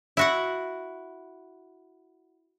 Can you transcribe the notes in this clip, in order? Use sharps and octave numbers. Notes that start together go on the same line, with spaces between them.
E4 F#4 F#5